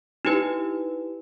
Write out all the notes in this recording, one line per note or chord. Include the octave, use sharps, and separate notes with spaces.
D#4 E4 G4 B4